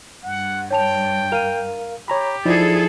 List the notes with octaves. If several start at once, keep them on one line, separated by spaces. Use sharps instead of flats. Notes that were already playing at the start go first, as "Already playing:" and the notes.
G2 F#5
C#5 G5 A5 F7
A#4 F5 D#7 F7
G4 C#5 A#5 B5
F3 D#4 E4 G#4 A4 D5